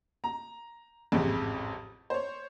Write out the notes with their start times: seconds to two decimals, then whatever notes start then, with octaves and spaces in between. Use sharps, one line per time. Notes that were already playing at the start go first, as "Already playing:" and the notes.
0.24 A#5
1.12 A1 F2 G#2 C3
2.10 C5 C#5